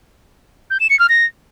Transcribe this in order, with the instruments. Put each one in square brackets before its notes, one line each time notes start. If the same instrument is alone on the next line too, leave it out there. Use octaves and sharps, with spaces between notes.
[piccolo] G6
E7
C#7
F6
A#6